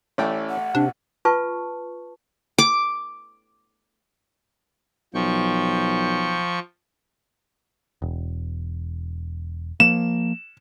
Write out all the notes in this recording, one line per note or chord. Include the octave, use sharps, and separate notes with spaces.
A1 A3 C#4 E4 D5 G5
F#5
C3 D4
F4 B4 A5 C#6
D6
B1 F3 G5 C#6
E1
F3 A#3 E7